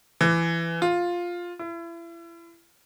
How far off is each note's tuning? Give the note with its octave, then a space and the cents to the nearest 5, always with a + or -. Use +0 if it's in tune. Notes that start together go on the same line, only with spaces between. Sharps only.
E3 +20
F4 +5
E4 +35